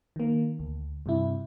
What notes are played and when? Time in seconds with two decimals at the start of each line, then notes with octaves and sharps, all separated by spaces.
0.16 D#3 A#3
0.59 D2
1.06 G2 C3 E4